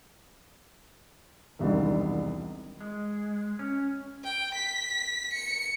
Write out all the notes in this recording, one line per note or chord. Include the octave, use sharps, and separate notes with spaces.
E1 C2 D#3 D4
G#3
C#4
G5
B6
C#7